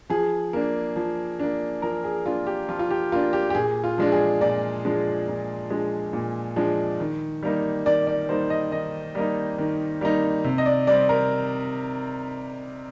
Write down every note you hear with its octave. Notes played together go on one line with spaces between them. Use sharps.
F3 G#4
A#3 D4
F3
A#3 D4
F3 A#4
G#4
A#3 D4 F4
G4
F3 F4
F4
G4
A#3 D4 F4
G4
G4
A#2 G#4
F4
F3 G#3 D4
G#4
A#2 D5
F3 G#3 D4
A#2
F3 G#3 D4
A#2
F3 G#3 D4
D#3
G3 A#3 D#4
D#3 D5
D5
G3 A#3 D#4 C5
D#5
D#3 D#5
G3 A#3 D#4
D#3
G3 A#3 D#4
C3
D#5
D5
G3 C4 D5
A#4